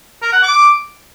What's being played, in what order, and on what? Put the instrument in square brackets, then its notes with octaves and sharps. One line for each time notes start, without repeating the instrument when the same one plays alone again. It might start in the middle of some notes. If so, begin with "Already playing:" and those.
[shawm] A#4
F#5
D6